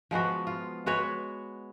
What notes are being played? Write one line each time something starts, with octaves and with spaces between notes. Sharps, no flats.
F3 G#3 B3 F#4
F4
G#3 F#4 B4 C#5